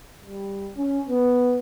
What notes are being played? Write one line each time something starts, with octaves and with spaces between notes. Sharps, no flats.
G3
C#4
B3